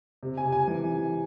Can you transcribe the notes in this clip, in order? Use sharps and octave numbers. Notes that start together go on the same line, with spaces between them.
C3
G#5
C3
G#5
E3